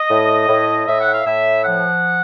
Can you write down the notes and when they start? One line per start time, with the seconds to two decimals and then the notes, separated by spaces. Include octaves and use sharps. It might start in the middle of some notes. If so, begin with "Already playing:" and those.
Already playing: D#5
0.10 A2
0.49 A2
0.87 A2 E5
1.00 F#5
1.13 F5
1.26 A2 E5
1.64 F3 F#5